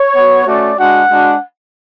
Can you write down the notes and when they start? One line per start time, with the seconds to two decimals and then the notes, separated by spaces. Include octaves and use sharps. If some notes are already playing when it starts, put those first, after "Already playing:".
Already playing: C#5
0.16 B3 F#4
0.46 A3 C#4 F#4 D5
0.78 G#3 D4 F#4 F#5
1.09 G#3 D4 F#4